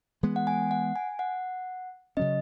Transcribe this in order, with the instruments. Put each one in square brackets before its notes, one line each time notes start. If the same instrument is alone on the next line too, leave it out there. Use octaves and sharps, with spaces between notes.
[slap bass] E3 G#3 B3
[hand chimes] F#5
G#5
F#5
G#5
F#5
[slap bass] C#3 F#3 C#4 [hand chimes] D#5